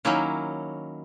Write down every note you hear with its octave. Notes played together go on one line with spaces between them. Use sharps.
D#3 F#3 A#3 C#4 E4